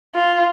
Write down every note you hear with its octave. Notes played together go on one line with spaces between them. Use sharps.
F4